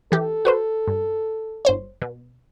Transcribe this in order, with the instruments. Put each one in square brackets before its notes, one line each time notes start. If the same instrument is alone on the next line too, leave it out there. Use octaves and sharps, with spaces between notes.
[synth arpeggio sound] E3 G4 [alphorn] A4
[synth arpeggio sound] F#4 B4 C5
G2
G1 C5 C#5
B2